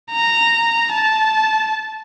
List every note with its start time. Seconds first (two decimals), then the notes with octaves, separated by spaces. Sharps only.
0.11 A#5
0.93 A5